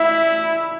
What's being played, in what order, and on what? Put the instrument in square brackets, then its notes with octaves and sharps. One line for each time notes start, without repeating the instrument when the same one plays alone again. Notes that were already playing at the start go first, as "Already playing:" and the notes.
Already playing: [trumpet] E4 [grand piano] E5